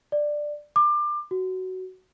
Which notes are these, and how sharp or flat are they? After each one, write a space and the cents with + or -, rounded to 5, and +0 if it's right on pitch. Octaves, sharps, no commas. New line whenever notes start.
D5 +10
D6 +25
F#4 +10